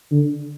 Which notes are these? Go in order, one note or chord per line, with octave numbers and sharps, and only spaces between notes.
D3